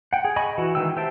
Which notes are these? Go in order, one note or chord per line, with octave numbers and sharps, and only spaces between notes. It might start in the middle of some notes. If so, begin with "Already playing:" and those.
F#5 G5
G#4
D#5 G#5 B5 C#6
E3 F#4
D#3 E3 G#3 G5 E6
G4 C5 E5 G5 A5